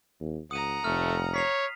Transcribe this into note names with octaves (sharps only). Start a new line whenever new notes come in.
D#2
C#2 F#5 A#5 D#6 D#7
F1 A3 F6
C#5 B6 C7 F7